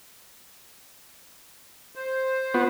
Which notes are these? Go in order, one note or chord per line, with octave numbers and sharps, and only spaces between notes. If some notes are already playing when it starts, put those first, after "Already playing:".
C5
B3 F4